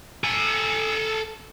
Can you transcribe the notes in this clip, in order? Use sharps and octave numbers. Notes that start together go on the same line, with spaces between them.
A4 G#5